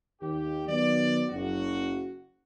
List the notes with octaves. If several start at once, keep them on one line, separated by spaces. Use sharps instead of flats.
D#2 G4
D#3 F#3 B3 F#4 D5
F#1 F#2 F#4